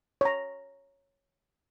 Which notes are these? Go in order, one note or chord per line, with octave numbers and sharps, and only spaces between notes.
C#5 A#5